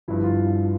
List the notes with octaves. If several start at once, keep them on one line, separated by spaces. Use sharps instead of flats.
G1 G2 F3 E4
F4